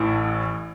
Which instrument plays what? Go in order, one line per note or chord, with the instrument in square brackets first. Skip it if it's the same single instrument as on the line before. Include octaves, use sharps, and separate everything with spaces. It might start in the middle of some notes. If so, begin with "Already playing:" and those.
Already playing: [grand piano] A1 A2 E3